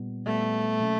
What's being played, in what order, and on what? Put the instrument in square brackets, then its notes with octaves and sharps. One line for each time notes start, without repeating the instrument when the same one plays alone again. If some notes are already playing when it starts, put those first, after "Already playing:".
Already playing: [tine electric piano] A#2 G3 B3
[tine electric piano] A#2 G3 B3 [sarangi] A3
[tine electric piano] B2 F#3 A#3 C#4